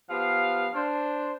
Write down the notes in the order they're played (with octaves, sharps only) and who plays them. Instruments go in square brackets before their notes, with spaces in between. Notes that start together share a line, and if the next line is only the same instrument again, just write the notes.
[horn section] F3 B3 G4 F5
D4 C5